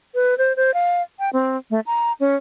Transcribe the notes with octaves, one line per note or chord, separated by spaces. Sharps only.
B4
C5
C5
F5
G5
C4
A3
A#5
C#4